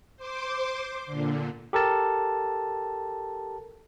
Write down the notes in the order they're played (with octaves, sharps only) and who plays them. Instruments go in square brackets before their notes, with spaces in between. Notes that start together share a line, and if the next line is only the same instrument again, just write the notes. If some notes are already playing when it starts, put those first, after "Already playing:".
[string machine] C5 C6 D6
A#2 D3
[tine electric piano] G4 A4 A#4 A5